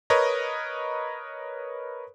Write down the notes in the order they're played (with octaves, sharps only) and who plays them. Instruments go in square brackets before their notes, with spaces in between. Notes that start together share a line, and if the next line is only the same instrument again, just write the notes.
[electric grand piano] A#4 B4 C#5 D#5